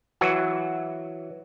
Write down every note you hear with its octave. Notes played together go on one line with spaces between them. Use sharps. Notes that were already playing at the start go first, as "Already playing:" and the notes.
E3 F#3 F#4